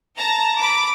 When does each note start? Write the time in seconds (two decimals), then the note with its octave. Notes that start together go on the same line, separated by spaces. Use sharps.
0.17 A5 A#5
0.59 B5 D6